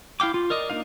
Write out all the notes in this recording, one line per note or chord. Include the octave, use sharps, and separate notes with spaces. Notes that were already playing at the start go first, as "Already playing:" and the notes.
E4 F5 G5 D6
F4
A#4 D5 D#5
A#3 D4 D#4 F5